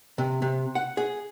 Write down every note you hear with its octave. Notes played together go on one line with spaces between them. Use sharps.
C3
C3
F#5
G#4